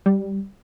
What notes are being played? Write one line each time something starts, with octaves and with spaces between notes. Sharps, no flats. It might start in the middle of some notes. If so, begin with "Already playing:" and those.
G3